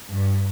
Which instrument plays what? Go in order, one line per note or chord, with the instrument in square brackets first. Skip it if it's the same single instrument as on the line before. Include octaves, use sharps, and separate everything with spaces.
[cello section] G2